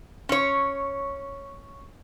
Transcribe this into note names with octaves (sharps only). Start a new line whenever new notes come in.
C#4 C#5